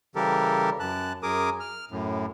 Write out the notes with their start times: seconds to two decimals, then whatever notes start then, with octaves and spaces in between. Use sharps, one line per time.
0.15 C#3 E3 G3 G4 A4 A#4
0.80 F#2 A5 F#6
1.23 F#2 G#4 A#4 D6 D#6
1.60 F6
1.91 F#2 A2